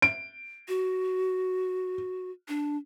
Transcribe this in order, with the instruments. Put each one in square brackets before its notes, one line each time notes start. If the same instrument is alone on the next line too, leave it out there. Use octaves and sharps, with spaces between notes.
[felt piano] D7
[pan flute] F#4
D4